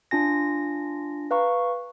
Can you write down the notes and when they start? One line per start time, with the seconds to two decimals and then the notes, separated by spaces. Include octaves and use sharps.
0.11 D4 F4 G#5 A#6
1.31 B4 F5 A#5 C#6